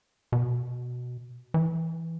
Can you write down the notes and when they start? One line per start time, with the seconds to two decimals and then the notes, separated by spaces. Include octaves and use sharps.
0.32 B2
1.54 E3